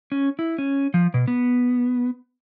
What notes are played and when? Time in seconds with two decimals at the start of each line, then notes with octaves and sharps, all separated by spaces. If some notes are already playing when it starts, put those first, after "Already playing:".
0.12 C#4
0.39 E4
0.58 C#4
0.94 F3
1.14 B2
1.28 B3